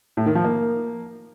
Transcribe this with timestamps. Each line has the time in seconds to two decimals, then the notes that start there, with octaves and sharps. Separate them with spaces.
0.17 A2
0.26 D#3
0.35 F3
0.44 A#3